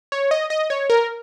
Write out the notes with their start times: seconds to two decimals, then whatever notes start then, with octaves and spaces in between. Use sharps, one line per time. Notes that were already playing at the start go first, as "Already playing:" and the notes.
0.12 C#5
0.31 D#5
0.50 D#5
0.70 C#5
0.90 A#4